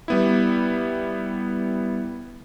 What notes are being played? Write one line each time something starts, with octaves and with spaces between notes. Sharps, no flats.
G3 B3 E4